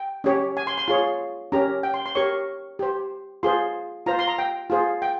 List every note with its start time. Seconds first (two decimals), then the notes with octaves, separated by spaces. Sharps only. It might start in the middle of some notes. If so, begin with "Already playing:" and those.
Already playing: G5
0.24 C#4 G4 C#5
0.57 G#5
0.67 C6
0.78 C6
0.88 F4 G#4 C#5 C6
1.52 C#4 G4 A#4 A#5
1.83 G5
1.94 C6
2.06 C6
2.15 G4 A#4 C#5 C#6
2.79 G4 C5
3.43 F4 G#4 C5 C6
4.06 F4 C5 A#5
4.19 C6
4.28 A#5
4.39 G5
4.70 F4 G#4 C5
5.02 G5